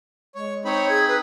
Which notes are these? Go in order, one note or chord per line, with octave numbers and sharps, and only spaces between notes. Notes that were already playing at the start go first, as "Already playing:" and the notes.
G#3 C#5
C4 D#4 C#5 B5
G#4 G#6
B4